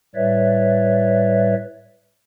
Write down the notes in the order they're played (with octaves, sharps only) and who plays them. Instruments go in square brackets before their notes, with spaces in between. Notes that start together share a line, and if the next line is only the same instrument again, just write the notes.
[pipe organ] A2 G3 B4 C#5 D5 E5